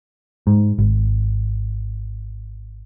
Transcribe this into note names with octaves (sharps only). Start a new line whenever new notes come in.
G#2
G#1